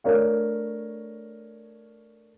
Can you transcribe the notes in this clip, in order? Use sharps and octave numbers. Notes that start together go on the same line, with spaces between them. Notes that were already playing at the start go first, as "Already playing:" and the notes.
A3 D4 A#4 C#5 F5